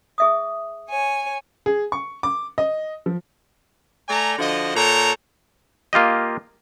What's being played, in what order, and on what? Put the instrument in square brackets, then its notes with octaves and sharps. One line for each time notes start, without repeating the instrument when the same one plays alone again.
[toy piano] G#4 E5 D#6
[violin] C#5 G#5
[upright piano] G#4
C#6
D6
D#5
F3
[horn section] A3 D5 G#5 A#5
D3 F3 F#4 D#5
A#2 A4 C#5 G5 A#5
[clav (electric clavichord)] A#3 F4 G4 D#5